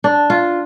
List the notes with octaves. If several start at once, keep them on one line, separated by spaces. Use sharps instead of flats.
D4
F4